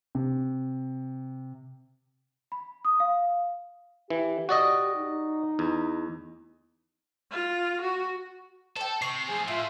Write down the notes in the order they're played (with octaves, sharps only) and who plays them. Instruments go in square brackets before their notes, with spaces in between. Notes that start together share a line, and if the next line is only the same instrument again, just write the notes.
[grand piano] C3
[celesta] B5
D#6
F5
[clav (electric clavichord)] E3 [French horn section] G4
[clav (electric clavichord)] F#4 D5 D#5
[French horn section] D#4
[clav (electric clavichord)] E2
[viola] F4
F#4
[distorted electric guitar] A4 [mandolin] G5 A5
[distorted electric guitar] C3 [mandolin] C#6 [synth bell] C7
[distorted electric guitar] A2 F3 [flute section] G#4 G#5 C6
[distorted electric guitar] A2 [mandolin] A3 [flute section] F4 E5 C6